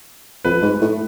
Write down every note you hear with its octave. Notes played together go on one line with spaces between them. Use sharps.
F2 B4
G#2
A2